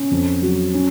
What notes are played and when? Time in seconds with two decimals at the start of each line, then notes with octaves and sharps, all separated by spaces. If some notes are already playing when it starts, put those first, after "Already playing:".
Already playing: C#4
0.11 F2
0.42 F#3
0.74 C#4